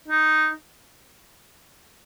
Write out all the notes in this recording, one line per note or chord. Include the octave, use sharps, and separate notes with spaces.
D#4